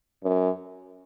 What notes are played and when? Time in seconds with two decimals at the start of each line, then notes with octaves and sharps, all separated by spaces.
0.23 F#2